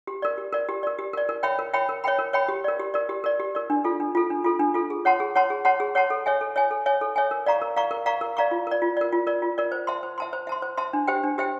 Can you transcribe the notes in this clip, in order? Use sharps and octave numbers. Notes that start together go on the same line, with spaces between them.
G4
A#4 D5
G4
A#4 D5
G4
A#4 D5
G4
A#4 D5
A#4
C#5 E5 G5 B5
A#4
C#5 E5 G5 B5
A#4
C#5 E5 G5 B5
A#4
C#5 E5 G5 B5
G4
A#4 D5
G4
A#4 D5
G4
A#4 D5
G4
A#4 D5
D4
F4 A4
D4
F4 A4
D4
F4 A4
D4
F4 A4
G#4
C#5 F#5 A5 C6
G#4
C#5 F#5 A5 C6
G#4
C#5 F#5 A5 C6
G#4
C#5 F#5 A5 C6
A4
C#5 E5 G#5
A4
C#5 E5 G#5
A4
C#5 E5 G#5
A4
C#5 E5 G#5
A#4
D5 F5 A#5 C#6
A#4
D5 F5 A#5 C#6
A#4
D5 F5 A#5 C#6
A#4
D5 F5 A#5 C#6
F4
A#4 D5
F4
A#4 D5
F4
A#4 D5
F4
A#4 D5
C5
E5 A5 C6
C5
E5 A5 C6
C5
E5 A5 C6
C5
E5 A5 C6
D4
G4 C5 E5 G5
D4
G4 C5 E5 G5